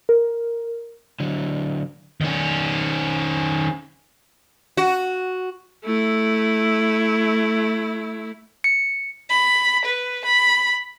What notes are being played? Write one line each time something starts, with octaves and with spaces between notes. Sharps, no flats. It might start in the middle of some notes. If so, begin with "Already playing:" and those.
A#4
D3 F#3
D#3 C#4
F#4
A3 E4
C#7
B5
B4
B5